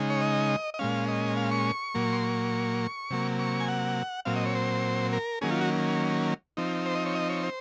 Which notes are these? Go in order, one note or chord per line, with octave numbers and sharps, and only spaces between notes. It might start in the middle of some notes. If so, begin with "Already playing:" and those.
Already playing: C#3 G#3 D#4
C#5
D#5
D#5
A#2 G#3 C#4 F5
D#5
F5
C#6
A#2 F#3 A#3
C6
C#6
C3 F#3 A#3
C#6
G#5
F#5
A#2 F#3 C4 F5
D#5
C#5
C5
A#4
D#3 F#3 A#3 C#4 G#4
F4
F#4
F3 C4 D#4
C5
D#5
C#5
D#5
C#5
C5